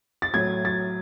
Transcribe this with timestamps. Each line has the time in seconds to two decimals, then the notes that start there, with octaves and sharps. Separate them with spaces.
0.22 A6
0.34 A2 F#3 G#6
0.65 A6